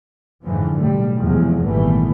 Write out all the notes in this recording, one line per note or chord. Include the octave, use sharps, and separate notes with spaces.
F2 G#2 D3 E3 F3
B1 A2 G3 A3
E2 C3 F3 G#3
G#1 A#2 E3 G3 A3 B3